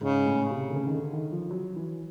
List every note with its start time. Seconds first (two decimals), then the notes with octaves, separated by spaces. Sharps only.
0.01 G#2 C#3
0.26 A2
0.51 C3
0.70 D3
0.76 C#3
0.87 D#3
0.94 D3
1.13 D#3
1.32 F3
1.51 F#3
1.76 E3